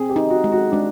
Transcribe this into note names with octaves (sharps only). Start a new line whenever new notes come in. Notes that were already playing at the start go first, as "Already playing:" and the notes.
Already playing: C4 G#4
G4
D#4
F#4
G#3
F#4
G#3 D4